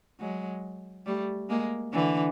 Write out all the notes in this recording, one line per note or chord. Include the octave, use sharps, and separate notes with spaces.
F#3 G#3
G3 A3
G#3 A#3
D3 E3